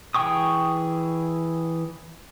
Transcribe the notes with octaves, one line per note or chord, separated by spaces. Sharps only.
E3 G#4 G5 C#6 D#6